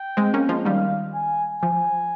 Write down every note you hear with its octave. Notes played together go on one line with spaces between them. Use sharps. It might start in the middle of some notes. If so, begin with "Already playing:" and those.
Already playing: G5
G#3 C4
A#3 C#4
F3 G#3
D#3 G3 F5
G#5
F3 G#5